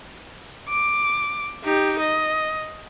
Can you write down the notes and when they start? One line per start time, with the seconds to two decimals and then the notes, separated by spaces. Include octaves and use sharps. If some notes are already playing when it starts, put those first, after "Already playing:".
0.69 D6
1.64 D#4 G4
1.99 D#5